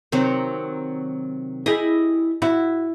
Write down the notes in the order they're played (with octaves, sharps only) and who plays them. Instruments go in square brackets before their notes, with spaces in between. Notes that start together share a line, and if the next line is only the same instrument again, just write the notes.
[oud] C3 D#3 F#3 [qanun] C4
[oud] E4 G4 G#4 [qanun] D#5 G#5
[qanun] E4 [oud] F#4